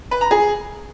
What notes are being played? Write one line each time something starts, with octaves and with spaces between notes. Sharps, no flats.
B4
A#5
G#4